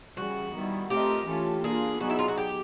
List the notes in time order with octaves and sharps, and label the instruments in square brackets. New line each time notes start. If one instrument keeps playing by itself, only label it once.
[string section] C#3 E3 G3 [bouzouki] F#4
[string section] D#3 G3 B3 E4
[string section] A3 C4 F4 A#4 D#5 [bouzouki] G4
[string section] E3 A3 C#4 F4 A4
[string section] A#3 D4 F4 [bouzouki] G#4
[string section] F#3 B3 D#4 G#4 [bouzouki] F#4
[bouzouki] E4
F4
F#4
G4